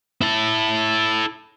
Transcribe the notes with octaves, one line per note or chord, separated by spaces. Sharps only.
E4 A4